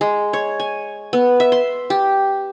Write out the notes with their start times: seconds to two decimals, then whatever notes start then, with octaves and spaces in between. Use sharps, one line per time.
0.01 G#3
0.33 C#5
0.60 G#5
1.13 B3
1.40 E5
1.52 C6
1.90 G4